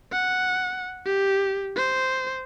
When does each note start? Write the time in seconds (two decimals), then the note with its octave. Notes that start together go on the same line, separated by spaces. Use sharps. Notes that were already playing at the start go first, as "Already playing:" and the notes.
0.12 F#5
1.06 G4
1.76 C5